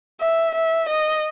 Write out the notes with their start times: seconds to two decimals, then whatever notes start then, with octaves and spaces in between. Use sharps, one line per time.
0.20 E5
0.55 E5
0.89 D#5